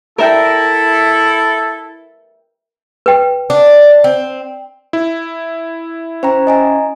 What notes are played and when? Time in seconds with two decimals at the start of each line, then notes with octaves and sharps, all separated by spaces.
0.18 E4 A4 A#4 E5 G5
3.06 B4 G5
3.50 D4
4.04 C4
4.93 E4
6.23 C#4 C5 G5 A#5
6.47 D#5 G#5 A#5